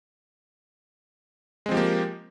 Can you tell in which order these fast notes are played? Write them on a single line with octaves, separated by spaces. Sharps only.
G#3 C4 F3 G4 A#3